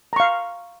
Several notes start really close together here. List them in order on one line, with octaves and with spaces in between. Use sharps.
A#5 C#6 F5